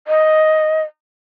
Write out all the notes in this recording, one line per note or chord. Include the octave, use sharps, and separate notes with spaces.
D#5